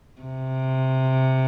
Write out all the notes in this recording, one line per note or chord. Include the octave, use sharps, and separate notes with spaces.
C3